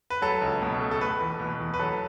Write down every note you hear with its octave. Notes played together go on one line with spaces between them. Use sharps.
B4
F#3 A4
C#2
B2
A3
A4
A3 B4
E2
B2
E2
B4
F#3 A4